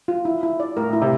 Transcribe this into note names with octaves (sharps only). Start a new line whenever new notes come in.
F4
E4
E4
D5
A2 A#4
A2 E4
C3